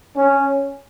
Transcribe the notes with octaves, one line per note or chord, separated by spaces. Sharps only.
C#4